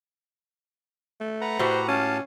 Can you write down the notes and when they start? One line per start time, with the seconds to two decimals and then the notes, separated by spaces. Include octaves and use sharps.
1.20 A3
1.41 B4 F#5 A#5
1.59 A2 F#4 G4 C5
1.88 C#4 F5 A5